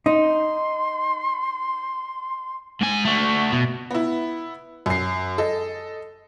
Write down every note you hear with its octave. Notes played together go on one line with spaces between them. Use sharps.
D#4 C6
G#2 G#5
A3 F#4
B2
B3 E4
F#2 C7
A4 D#5